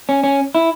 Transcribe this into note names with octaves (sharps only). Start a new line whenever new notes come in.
C#4
C#4
E4